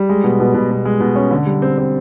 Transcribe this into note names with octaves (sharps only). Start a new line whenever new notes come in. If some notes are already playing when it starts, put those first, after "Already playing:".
Already playing: G3
G#3
B2
B2
B2
B2
G#3
B2
C#4
D3
G3
C4
C4